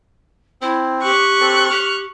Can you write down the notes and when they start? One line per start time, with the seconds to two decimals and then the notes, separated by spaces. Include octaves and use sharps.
0.62 C4 E4
1.03 G4 C#6 F#6
1.40 C4 A4
1.70 G4 F6